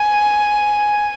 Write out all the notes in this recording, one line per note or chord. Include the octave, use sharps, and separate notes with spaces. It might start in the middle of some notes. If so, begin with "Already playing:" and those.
Already playing: G#5